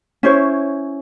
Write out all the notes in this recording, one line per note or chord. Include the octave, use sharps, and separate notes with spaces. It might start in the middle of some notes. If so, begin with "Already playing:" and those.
C#4 E4 C5 C#5